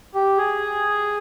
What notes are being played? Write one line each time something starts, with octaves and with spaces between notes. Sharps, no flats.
G4
G#4